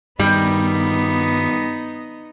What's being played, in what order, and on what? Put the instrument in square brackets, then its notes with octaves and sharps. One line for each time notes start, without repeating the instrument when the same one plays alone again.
[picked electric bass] G2 D#3 [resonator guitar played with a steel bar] G3 [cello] B3 D#4